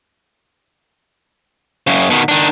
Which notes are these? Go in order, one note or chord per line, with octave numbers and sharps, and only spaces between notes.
F#2 C#3
B2 D#3
D#3 D4